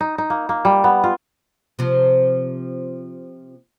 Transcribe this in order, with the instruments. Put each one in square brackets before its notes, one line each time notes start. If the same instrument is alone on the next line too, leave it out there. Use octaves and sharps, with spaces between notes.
[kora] D#4
D#4
A#3
A#3
G3
B3
F4
[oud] C3 F3